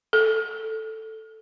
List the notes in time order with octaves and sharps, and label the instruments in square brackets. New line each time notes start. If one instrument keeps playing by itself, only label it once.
[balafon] A4